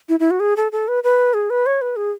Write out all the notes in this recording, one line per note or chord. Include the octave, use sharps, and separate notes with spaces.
E4
E4
F#4
G#4
A4
A4
B4
B4
G#4
B4
C#5
B4
G#4